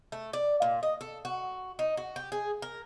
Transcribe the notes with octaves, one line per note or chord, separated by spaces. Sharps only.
A3
D5
A#2
D#5
A4
F#4
D#4
F#4
G4
G#4
A#4